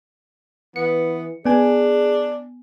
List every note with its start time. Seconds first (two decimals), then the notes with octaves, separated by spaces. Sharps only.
0.76 E3 B3 C#7
1.46 B3 D4 G#4 G#5